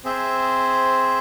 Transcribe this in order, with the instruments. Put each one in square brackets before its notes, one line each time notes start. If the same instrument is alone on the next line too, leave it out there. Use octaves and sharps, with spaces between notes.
[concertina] C4 G#4 C5 E5